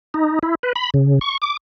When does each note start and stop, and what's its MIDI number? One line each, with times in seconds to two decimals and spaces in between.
0.14 0.39 63
0.43 0.55 64
0.63 0.73 71
0.76 0.90 83
0.94 1.19 49
1.21 1.37 85
1.42 1.57 86